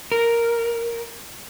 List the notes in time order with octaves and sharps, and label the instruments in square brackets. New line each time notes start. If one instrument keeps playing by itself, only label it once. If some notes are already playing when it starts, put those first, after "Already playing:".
[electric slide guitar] A#4